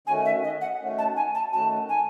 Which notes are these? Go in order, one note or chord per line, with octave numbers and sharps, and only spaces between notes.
D#3 A3 C#4 F#4 G#5
E5
D#5
F#5
D#3 A3 C#4 F#4
A5
G#5
A5
D#3 A3 C#4 F#4 A5
G#5